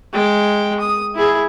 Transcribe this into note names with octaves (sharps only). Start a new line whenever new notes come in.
G#3 G5
D#6
E4 G#4